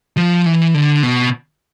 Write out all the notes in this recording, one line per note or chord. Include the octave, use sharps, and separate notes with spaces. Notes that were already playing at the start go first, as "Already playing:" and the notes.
F3
E3
D3
B2